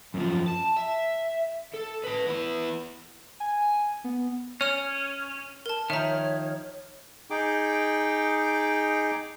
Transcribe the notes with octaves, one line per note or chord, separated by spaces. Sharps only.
F#2 F3
A5
E5
A4
B4 A5
B3 E4
G#5
B3
C#4 C#5 F6
A#4 A5
D#3 F3 C#5 E5 A#5
D#4 G#4 G5 D6